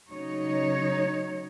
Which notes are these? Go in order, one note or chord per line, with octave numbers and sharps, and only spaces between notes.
C#3 F#3 D#4 C#5